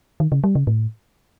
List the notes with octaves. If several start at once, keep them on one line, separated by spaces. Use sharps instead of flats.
D#3
C#3
G3
C#3
A2